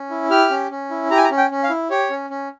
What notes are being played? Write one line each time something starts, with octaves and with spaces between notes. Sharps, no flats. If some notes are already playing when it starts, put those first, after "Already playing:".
Already playing: C#4
E4
G4 F6
C#4
C#4
E4
G4 A#5
G#5
A#5
C#4
G5
C#4
F5
E4
G4 C#5
C#4
C#4